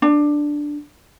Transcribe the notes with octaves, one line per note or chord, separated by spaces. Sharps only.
D4